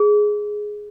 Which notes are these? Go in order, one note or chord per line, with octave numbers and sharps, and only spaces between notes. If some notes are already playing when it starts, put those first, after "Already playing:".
Already playing: G#4